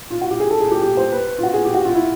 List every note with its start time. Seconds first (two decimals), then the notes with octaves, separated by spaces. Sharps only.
0.10 F4
0.21 F#4
0.31 G4
0.40 G#4
0.51 A4
0.60 G#4
0.71 G4
0.82 G4
0.97 C5
1.12 B4
1.39 F4
1.43 F#4
1.54 G#4
1.65 G4
1.74 F#4
1.85 F4
1.95 E4